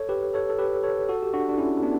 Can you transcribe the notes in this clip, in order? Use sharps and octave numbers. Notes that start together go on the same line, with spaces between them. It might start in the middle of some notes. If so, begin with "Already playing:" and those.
Already playing: A4 C#5
G4 B4
A4 C#5
A4
G4 B4
A4 C#5
F#4 A4
G4
D4 F#4
D4
C#4 E4
B3 D4